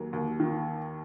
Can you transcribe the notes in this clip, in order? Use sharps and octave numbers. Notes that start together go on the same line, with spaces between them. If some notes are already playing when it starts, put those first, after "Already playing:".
Already playing: D#2 F#3
D#2
D#3